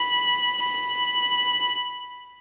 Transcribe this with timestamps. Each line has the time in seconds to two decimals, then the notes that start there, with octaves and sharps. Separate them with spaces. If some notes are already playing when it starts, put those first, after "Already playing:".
Already playing: B5
0.63 B5